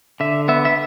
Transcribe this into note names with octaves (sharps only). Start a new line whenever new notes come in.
D3 E5
B3 E5
E5